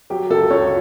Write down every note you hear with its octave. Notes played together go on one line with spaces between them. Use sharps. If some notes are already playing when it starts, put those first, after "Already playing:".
F#3 G4
C#2 A4
C#2 C#5